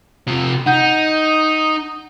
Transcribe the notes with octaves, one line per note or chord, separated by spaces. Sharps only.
C3 F4
D#4 F#5 G6